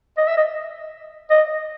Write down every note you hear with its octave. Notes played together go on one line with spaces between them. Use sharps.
D#5
E5
D#5
D#5